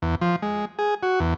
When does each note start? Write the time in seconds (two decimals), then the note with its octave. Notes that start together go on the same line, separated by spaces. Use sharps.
0.02 E2
0.21 F3
0.42 G#3
0.79 G#4
1.03 F#4
1.20 E2